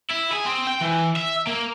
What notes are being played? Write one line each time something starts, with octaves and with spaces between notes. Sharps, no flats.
E4
G#4
C4
G5
E3
E5
A#3